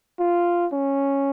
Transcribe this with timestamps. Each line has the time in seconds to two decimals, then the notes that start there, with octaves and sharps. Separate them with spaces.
0.19 F4
0.73 C#4